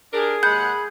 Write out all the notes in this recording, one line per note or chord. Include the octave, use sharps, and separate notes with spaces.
D4 G4 G#4 A#4
D#2 G#3 F#5 B5 G6